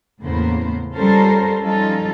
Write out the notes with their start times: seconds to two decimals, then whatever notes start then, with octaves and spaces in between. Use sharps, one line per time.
0.23 E2 A2 C#3 A#3 B3 C5
0.95 G3 C#4 F4 A4 A#4 C5
1.61 F3 G3 C#4 D#4 F4 A4